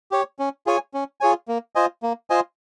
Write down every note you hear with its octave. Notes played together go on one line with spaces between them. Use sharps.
G4 C#5
C#4
F4 G#4 C#5 G#5
C#4
F4 G#4 C#5 G#5
A#3
F4 C5 D#5 G#5
A#3
F4 C5 D#5 G#5